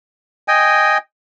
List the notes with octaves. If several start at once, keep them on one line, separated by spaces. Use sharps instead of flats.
D#5 G5 G#5